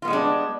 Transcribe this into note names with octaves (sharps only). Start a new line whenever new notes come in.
G3 G#3 B3 D4 F4